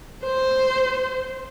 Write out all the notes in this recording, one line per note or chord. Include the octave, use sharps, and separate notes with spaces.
C5